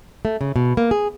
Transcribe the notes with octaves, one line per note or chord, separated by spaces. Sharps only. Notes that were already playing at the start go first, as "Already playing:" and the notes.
A3
C#3
B2
A#3
G#4